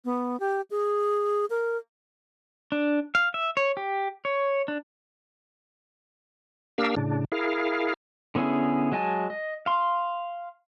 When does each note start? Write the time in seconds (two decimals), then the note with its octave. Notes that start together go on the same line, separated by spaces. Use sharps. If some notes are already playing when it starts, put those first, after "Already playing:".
0.05 B3
0.40 G4
0.71 G#4
1.50 A#4
2.72 D4
3.15 F5
3.34 E5
3.57 C#5
3.77 G4
4.25 C#5
4.68 D4
6.78 A#3 D4 G4 A#4 F5 E6
6.96 A2 C#3 D4
7.32 E4 G#4 A#4 F5
8.35 D3 B3 C#4 E4 G#4
8.92 F#3 G#3 D#5 G#5 A5
9.30 D#5
9.66 F5 C6